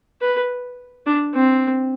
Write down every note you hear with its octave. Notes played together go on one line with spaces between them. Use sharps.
B4
D4
C4